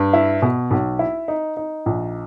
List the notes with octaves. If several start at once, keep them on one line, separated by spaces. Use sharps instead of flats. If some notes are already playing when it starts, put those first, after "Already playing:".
Already playing: G2
E4
B2
B1
E4
D#4
D#4
A#1